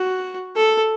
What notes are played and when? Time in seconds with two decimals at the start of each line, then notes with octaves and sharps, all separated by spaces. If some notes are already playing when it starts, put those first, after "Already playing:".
Already playing: F#4
0.56 A4